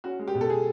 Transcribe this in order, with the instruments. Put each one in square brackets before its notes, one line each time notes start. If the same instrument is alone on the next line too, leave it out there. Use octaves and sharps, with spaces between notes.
[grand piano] C#4 F#4
G#3
G4
B2
A4
G#4